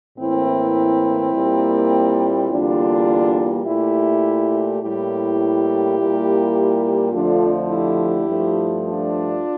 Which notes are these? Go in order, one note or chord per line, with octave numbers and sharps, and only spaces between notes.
A2 E3 A#3 C4 E4
A#2 G3 A#3
E2 D3 G3 A#3 D4 F4
A#2 A3 E4 G4
A2 G3 A#3 E4 G4
A#2 G3 A#3
F2 D3 F3 A3 D4 F4
E4 G4
G2 F3 A3
D4 F4